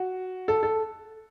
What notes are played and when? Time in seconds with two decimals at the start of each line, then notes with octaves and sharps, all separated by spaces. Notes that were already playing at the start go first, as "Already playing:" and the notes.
Already playing: F#4
0.48 A4
0.63 A4